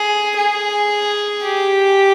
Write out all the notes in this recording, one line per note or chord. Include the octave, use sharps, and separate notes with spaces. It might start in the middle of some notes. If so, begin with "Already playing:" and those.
Already playing: G#4
G#4
G4